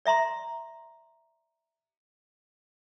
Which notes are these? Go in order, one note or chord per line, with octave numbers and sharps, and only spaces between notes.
D5 E5 A#5 C6